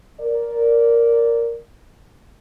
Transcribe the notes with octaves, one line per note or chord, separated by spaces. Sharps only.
A#4 D5